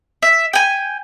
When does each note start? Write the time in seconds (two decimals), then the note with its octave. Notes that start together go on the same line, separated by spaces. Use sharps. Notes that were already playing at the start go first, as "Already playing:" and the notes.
0.22 E5
0.53 G5 G#5